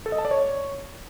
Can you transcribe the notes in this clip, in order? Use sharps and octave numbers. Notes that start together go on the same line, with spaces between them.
A4
D#5
A5
D5
C#5